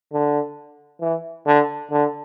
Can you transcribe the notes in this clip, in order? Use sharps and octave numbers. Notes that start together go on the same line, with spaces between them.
D3
E3
D3
D3